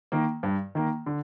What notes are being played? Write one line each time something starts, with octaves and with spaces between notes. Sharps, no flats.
D#3 A#3
G2
D#3 A#3
D3